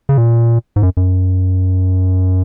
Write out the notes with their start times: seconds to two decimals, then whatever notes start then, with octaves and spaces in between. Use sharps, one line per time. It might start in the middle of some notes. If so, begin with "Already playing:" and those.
0.09 C#3
0.18 A#2
0.76 G#2
0.83 F#2
0.97 F#2